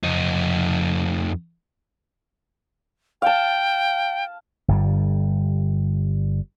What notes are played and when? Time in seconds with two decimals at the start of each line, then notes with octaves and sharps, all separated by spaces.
0.04 F2 D#4
3.22 F5 G5 A5
4.68 G1 G2 G3